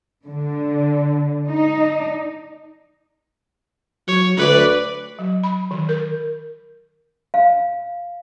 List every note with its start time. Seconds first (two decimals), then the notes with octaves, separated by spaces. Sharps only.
0.25 D3
1.47 D#4
4.08 F#3 C#5
4.37 D2 B4 D5
5.19 F#3
5.43 B5
5.71 D#3
5.89 A#4
7.34 F5